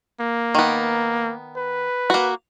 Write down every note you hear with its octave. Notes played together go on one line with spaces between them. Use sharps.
A#3
D#3 B3
B4
A#3 F#4